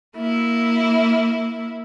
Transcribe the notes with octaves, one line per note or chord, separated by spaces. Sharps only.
A#3 E4